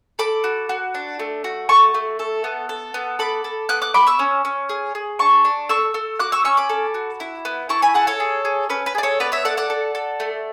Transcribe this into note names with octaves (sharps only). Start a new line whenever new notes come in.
A4 B5 D6
F#4
F#4
D4
A3
F#4
A3 A5 C#6
A3
A4
B3
A4
B3
A4 B5 D6
A4
B3 D6 F#6
D6 F#6
B3 B5 D6
C#6 E6
C#4
C#4
G#4
G#4
D4 A5 C#6
D4
A4 C#6 E6
A4
F#4 D6 F#6
C#6 E6
C#4 C#6 E6
B5 D6
A4
F#4
E4
B3
E4 A5 C#6
G#5 B5
G#4 F#5 A5
A4 C#5
G#4
G#4
C#4 B4
B4
G#4 D5
A4 C#5
B3 B4 D5
C#5 E5
A4 D5 F#5
D5 F#5
A4
A4
A3